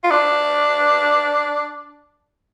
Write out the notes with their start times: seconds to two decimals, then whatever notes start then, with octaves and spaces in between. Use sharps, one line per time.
0.04 F4
0.11 D4